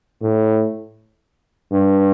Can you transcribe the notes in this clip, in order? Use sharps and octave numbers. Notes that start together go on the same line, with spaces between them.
A2
G2